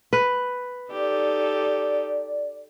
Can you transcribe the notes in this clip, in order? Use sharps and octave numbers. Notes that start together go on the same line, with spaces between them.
B4
D#4 G4 A4 D5